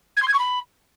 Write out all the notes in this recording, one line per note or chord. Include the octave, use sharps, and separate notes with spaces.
G#6
C6
G#6
C#6
B5